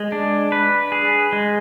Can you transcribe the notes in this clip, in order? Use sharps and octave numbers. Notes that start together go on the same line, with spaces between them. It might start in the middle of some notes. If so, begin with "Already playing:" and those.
Already playing: G#3 G#4
D4
B4
G#4
G#3